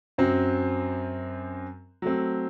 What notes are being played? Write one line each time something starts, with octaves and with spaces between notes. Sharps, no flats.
F#2 F#3 C4
F#3 A3 C4